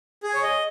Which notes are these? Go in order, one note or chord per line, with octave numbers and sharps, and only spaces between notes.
G#4
C#5
D#5